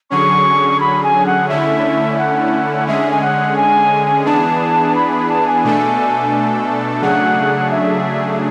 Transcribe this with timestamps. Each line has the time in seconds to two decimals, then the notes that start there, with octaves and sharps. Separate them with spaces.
0.10 D3 F#3 C#4 G#4 C#6
0.80 B5
1.03 G#5
1.26 F#5
1.49 D3 A3 C#4 E4 E5
2.17 F#5
2.87 D3 G#3 C#4 G#4 E5
3.11 G#5
3.21 F#5
3.57 G#5
4.25 E3 B3 D4 G#4 A5
4.95 B5
5.12 B5
5.29 A5
5.47 G#5
5.64 B2 A3 D4 A4
7.02 C#3 F#3 A3 D4 G#4 F#5
7.71 E5